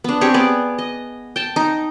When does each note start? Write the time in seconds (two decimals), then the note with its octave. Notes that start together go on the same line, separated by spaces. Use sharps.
0.04 B3 D4
0.21 C4 G4 G#4 C#5
0.34 B3 G#4 D5
0.78 D#5
1.36 G5 A5
1.56 D#4